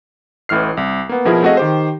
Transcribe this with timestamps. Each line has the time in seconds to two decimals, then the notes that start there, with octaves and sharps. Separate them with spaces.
0.49 A1 A2 E3 F6 C7
0.77 C2
1.09 A#3 B3
1.25 B2 F3 E4 G#4 A#4
1.43 A3 C4 F#4 G#4 D#5 F5
1.57 D#3 G4 C5